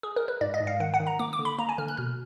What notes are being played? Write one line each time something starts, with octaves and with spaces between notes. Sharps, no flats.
G#4
A#4
B4
G#2 D5
D#5
G#2
F5
D#3 F#5
F#5
D#3
A#5
A#3 D6
D6
D3
B5
A#3 A#5
G#5
D3 F6
F#6
B2 F6